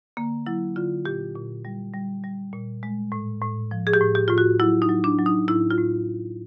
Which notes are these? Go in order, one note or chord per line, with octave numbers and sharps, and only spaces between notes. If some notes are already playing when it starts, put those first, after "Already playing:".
D3 A#3
F#3 E4
D3 F4
A#2 G4
A#2
G3
G3
G3
A#2
G#3
A2
A2
F3
G#4
G4
A2
G4
A2 F4
F#4
F#3 E4
D#4
F#3
D4
F#3
D#4
A2 E4
F4
A2